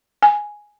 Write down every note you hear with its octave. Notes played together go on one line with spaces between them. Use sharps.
G#5